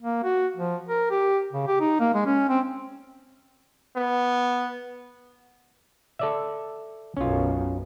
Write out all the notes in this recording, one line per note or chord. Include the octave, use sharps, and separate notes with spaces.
A#3
F#4
F3
A#4
G4
C#3
G4
D#4
A#3
G#3
C#4
C4
B3
A4 D5 E5
B1 F#2 C#4 F4